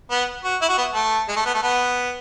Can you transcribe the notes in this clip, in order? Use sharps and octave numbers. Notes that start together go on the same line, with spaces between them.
B3
F#4
E4
F#4
B3
A3
G#3
A3
B3
A3
B3